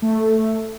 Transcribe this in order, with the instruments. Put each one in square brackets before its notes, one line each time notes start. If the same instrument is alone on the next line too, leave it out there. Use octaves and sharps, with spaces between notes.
[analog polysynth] A3